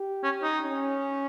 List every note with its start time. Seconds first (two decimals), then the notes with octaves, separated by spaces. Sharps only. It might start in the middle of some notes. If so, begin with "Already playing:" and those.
Already playing: G4
0.23 C#4
0.43 D#4
0.61 C#4